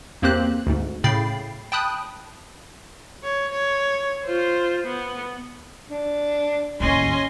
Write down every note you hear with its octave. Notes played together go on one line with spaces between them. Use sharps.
E2 A#3 C4 G4 C5 F#6
D2 G#2
A2 C#3 G5 B5 A6 C7
G5 A5 B5 D#6 F#6
C#5
C#5
F4 C5
B3
D4
A1 D#2 C#4 D#5 G#5 C6